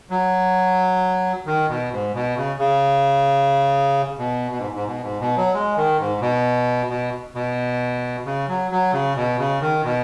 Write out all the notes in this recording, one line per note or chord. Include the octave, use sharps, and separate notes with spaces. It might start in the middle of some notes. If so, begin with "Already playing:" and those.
F#3
D#3
B2
G#2
B2
C#3
C#3
B2
B2
G#2
G#2
B2
G#2
B2
F#3
G#3
D#3
G#2
B2
B2
B2
C#3
F#3
F#3
C#3
B2
C#3
D#3
B2